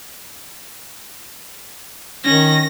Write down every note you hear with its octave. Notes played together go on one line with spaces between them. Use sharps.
D#3 C#4 A#6